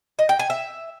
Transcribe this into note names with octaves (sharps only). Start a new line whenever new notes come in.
D#5
G5
G#5
E5